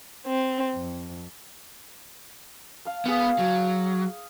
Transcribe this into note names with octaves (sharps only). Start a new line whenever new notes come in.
C4
F2
F5 A5
B3 G#4 F5
F#3